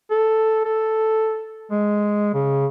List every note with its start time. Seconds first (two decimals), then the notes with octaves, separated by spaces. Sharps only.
0.11 A4
0.65 A4
1.71 G#3
2.34 C#3